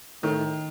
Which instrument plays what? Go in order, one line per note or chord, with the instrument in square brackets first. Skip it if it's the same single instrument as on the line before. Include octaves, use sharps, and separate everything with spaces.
[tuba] A2 [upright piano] D#3